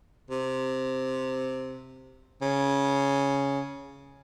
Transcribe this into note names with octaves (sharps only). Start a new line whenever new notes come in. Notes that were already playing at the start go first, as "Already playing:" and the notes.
C3
C#3